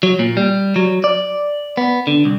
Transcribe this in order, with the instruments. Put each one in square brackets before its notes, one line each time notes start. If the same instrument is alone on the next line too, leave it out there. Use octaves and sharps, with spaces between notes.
[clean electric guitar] F#3
A#2
G3
F#3
D5
B3
D3
C2